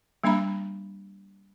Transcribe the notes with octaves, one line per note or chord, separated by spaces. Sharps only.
G3 A#3 D4 E5 A#5 B5